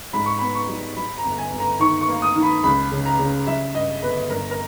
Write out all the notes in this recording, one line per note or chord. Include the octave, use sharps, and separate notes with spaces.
G#2 B5
C#6
B3 B5
C#6
G3
G3 B5
A#5
G1
G#5
G1
A#5
D#3 C#6
C#6
A#3
D#6
D#3
B5
C#2 B5
C#3
A#5
C#3
G3 E5
G2 D#5
G1 B4
G2 A#4
A#4